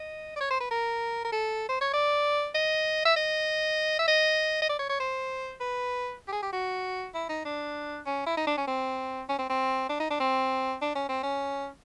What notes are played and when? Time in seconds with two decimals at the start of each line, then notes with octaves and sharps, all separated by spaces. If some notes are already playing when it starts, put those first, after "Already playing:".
Already playing: D#5
0.36 D5
0.40 C#5
0.50 C5
0.60 B4
0.71 A#4
1.24 A#4
1.32 A4
1.69 C5
1.81 C#5
1.93 D5
2.55 D#5
3.05 E5
3.16 D#5
3.99 E5
4.08 D#5
4.62 D#5
4.69 D5
4.79 C#5
4.89 C#5
5.00 C5
5.61 B4
6.28 G4
6.32 G#4
6.43 G4
6.53 F#4
7.15 E4
7.29 D#4
7.45 D4
8.06 C#4
8.26 E4
8.37 D#4
8.47 D4
8.57 C#4
8.68 C4
9.29 C#4
9.39 C4
9.49 C4
9.89 D4
10.00 D#4
10.10 D4
10.20 C4
10.82 D4
10.95 C#4
11.09 C4
11.23 C#4